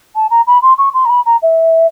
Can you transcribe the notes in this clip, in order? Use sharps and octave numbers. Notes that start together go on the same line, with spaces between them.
A5
A#5
B5
C6
C#6
C6
A#5
B5
A#5
E5